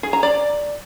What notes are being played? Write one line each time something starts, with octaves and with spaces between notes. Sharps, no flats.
G#4
A#5
D5